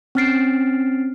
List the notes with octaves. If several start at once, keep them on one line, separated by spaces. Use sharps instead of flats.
C4 C#4 F6 A6 C7 D7